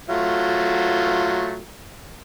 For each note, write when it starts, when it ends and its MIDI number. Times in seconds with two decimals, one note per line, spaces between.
0.09 1.61 54
0.09 1.61 57
0.09 1.61 65